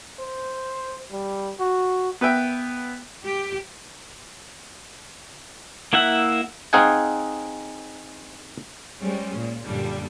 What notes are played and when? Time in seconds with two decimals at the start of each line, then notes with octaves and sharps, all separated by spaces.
0.19 C5
1.12 G3
1.60 F#4
2.21 B3 B4 E5 G5
3.25 G4
5.93 A#3 E4 E5 F#5
6.73 C4 D#4 G#4 F5 F#5 G#5
9.01 G3 G#3 C#4 C5
9.37 A#2
9.65 F#2 A#2 D3 G3 D4